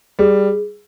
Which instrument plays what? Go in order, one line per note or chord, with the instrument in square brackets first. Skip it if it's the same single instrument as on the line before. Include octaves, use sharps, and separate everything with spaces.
[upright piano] G3 [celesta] G#4